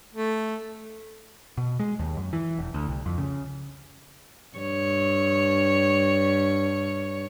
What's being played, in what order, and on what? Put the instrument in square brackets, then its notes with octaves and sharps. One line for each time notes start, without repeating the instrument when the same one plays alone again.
[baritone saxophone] A3
[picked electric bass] B2
G#3
D#2
F#2
E3
E1
D2
C2
F2
C#3
[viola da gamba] G2 C#5